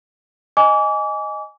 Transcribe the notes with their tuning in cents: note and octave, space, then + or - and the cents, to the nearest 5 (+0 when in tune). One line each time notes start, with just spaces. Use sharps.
D#5 +0 G#5 +0 D6 -35